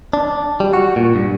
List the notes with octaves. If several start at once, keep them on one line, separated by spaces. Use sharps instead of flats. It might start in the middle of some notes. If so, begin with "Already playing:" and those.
D4
G3
F#4
A#2
G2